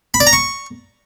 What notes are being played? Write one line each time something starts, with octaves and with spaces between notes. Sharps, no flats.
B5
D5
A#5
C#6